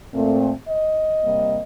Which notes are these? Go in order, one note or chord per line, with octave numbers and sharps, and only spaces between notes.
A#2 A3 C4
D#5
C3 G3 A#3